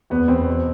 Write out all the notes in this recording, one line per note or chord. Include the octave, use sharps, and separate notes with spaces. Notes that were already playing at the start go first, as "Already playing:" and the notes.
E2 B3
E2 C4
B2